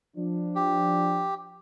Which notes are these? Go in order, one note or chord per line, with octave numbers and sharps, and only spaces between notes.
F3 D4
G4